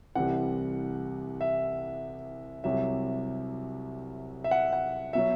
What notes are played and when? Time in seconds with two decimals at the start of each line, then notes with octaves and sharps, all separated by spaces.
0.15 C2 C3 E3 G3 F#5
1.41 E5
2.64 C2 C3 F#3 E5
4.44 E5
4.51 F#5
4.73 F#5
5.13 B2 F#3 E5